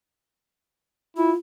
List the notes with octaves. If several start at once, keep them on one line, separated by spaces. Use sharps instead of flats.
E4 F4